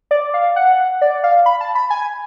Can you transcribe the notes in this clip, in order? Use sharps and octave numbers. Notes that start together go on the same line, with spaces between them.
D5
F5
F#5
D5
F5
B5
A5
B5
G#5